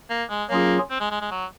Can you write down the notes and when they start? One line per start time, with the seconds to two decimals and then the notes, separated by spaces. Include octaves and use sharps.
0.10 A#3
0.30 G#3
0.50 F#3 A#3 C#4 F4 G#4
0.90 C4
1.00 G#3
1.11 G#3
1.21 G#3
1.31 F#3